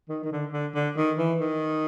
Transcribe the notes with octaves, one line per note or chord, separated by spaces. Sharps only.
D#3
D#3
D3
D3
D3
D#3
E3
D#3